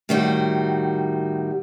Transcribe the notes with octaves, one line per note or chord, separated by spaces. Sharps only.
A2 D#3 G3 F#4